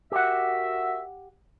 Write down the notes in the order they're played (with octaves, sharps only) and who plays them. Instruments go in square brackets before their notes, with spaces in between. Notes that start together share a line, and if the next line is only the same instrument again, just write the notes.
[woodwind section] F#4 A#4 E5 [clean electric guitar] G4 F#5